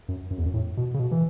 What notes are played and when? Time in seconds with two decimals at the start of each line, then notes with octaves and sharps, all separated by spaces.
0.09 F#2
0.31 F#2
0.38 E2
0.46 F#2
0.54 A2
0.77 B2
0.94 C#3
0.99 B2
1.11 E3